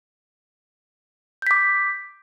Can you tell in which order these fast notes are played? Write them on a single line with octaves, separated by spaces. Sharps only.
G6 B6 D6